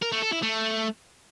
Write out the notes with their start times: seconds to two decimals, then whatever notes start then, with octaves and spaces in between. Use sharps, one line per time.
0.02 A#4
0.12 A3
0.22 A4
0.32 E4
0.43 A3